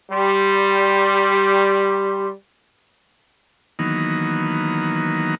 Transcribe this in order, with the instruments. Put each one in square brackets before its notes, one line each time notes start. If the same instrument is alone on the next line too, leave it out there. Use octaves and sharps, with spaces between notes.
[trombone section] G3 [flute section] G4 C6
[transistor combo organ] D#3 E3 F#3 A#3 B3 D#4